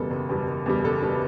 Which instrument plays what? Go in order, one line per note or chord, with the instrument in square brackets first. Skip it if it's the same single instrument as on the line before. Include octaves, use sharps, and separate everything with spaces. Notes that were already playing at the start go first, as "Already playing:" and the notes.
Already playing: [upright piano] F#1 E2 B2 G3 A4
F#1
E2 B2 G3
F#1
E2 B2 G3
F#1 A4
B2 G3